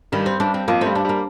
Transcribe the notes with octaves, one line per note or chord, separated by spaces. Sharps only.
G2 D#3 G3
C4
G2 G3 D4
C4
F2 F3 A#3
G2 G3 A3 C4
D4
G3 A#3